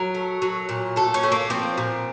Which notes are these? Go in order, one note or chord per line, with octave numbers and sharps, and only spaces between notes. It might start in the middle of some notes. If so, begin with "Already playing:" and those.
Already playing: F#3 A#4
A3
F#3
A#2
A3 A4
C#4
A3
A#3
F3 C4
A#2